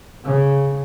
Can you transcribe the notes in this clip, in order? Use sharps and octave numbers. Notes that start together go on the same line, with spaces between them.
C#3